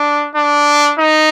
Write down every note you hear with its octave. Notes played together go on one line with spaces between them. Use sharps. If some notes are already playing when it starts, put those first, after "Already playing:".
Already playing: D4
D4
D#4